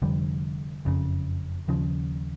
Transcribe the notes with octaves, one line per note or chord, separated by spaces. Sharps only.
F1 F2 D3 G3
F#1 F2 C#3
D#2 C#3 F3